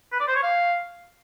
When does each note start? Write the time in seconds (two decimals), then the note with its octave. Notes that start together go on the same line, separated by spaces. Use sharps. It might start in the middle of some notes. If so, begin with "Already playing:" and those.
0.12 B4
0.20 D5
0.28 C5
0.35 C#5
0.43 F5